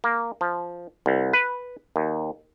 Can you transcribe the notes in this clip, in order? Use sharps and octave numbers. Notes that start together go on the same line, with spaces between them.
A#3
F3
C2
B4
D#2